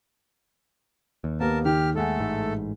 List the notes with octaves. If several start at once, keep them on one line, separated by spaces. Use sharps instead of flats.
D#2
A#3 B3 G4 A#4 A5
D#3 G4 F6
G#3 A3 A4 F#5 G#5
A1 G#2